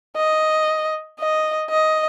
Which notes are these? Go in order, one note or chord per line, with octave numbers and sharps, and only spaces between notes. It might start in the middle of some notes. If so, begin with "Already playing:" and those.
D#5
D#5
D#5